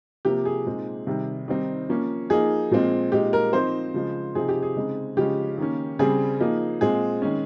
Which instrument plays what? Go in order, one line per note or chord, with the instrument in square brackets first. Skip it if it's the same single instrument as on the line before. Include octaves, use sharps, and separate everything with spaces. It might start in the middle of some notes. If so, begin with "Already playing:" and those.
[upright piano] C3 F3 A#3 G4
G#4
A#2 G#3 C4 D#4
C3 D#3 G3
D#3 G3 C4 D#4
F3 A#3 C#4
F3 A#3 D#4 G#4
A#2 F3 G#3 C4
A#2 G#3 D#4 G4
A#4
F3 C4 D#4 C5
C#3 F3 G#3
C3 F3 C4 D#4 G#4
G4
G#4
C#3 G#3 C4 D#4
C#3 F3 G#3 C#4 G4
D#3 A#3 C#4
C#3 G3 C4 G#4
F3 A#3 D#4
A#2 G#3 C4 G#4
D#3 G#3 C#4